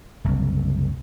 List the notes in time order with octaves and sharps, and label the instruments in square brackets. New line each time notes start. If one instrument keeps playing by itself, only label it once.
[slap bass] F#1 C2